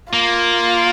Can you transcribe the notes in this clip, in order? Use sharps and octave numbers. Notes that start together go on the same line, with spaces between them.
A#3 F4